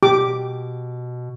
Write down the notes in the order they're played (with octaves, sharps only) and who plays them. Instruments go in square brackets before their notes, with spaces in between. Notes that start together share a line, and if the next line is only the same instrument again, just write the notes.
[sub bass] B2 [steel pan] G4 D6